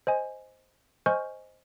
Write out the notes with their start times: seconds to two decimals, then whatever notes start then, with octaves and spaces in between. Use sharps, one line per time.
0.07 C5 D#5 G#5
1.06 C5 D#5 G#5 C#6 F6 G6